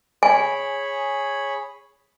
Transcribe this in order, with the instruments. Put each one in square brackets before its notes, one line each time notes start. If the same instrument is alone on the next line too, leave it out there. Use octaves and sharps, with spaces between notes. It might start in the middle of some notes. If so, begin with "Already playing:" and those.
[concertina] G#4 C#5 B5 [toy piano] G#5